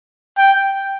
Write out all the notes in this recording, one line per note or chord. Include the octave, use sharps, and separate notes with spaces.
G5